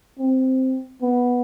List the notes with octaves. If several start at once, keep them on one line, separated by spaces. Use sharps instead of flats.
C4
B3